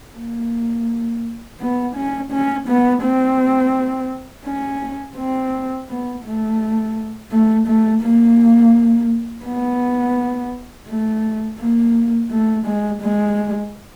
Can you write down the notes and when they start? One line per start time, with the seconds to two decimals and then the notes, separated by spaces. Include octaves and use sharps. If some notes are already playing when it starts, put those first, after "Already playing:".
0.17 A#3
1.61 B3
1.95 C#4
2.32 C#4
2.68 B3
3.03 C4
4.45 C#4
5.17 C4
5.89 B3
6.24 A3
7.32 A3
7.67 A3
8.03 A#3
9.45 B3
10.88 A3
11.60 A#3
12.31 A3
12.66 G#3
13.02 G#3